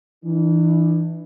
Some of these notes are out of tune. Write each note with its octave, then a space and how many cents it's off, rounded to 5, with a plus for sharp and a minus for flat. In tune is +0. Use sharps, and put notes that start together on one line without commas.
E3 +0 D4 +40